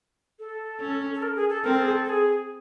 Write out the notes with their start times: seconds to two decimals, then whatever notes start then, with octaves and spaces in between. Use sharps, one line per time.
0.39 A4
0.80 C#4
1.14 A4
1.22 A#4
1.36 G#4
1.50 A4
1.64 C4 A#4
1.73 A4
1.82 G#4
1.91 A4
2.05 A4
2.09 G#4